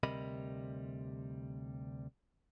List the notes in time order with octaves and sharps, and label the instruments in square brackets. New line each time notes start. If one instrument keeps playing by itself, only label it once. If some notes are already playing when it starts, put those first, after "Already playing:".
[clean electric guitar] D2 C3 G3 A#4 D#5 B5